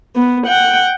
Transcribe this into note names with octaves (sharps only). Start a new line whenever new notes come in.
B3
F#5 G5